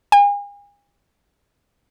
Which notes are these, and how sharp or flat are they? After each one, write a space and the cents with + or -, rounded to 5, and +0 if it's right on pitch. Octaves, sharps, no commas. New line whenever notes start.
G#5 -40